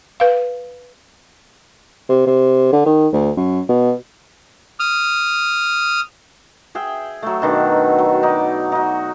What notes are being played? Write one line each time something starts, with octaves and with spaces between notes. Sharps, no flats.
B4 F5
C3
C3
D3
D#3
D2
F#2
B2
D#6 F6
G#4 E5 G5
F#3 A3
B2 D#3 D4
F#3
D#4 D5
D#4 F#4